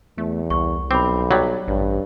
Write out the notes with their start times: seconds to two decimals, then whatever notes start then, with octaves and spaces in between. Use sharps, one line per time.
0.18 E2 A3
0.50 C2 C#6
0.91 B1 C4 B5 D6
1.31 F#3 G3 C#5
1.68 A1 G2